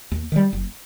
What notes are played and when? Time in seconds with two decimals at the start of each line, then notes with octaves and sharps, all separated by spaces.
0.11 D#2
0.32 D#3 G3
0.53 F#1